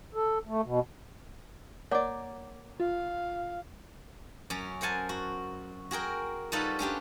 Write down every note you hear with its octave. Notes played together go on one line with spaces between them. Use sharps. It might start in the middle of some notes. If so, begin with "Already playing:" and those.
A4
A3
B2
A#3 C#5 D5 F#5 D6
F4 F5
F#2 C#4
A#4 C5 F#5 G#5 A5
F#4
F#4 G#4 A#4 G5
G3 D#4 F4 F#4 A4 B4
C#4 D4 G4 B4